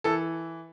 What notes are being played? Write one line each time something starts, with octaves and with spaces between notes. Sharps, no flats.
E3 A4